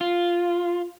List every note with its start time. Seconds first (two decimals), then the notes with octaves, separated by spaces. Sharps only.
0.01 F4